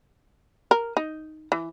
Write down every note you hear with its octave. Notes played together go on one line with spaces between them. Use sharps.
A#4
D#4
E3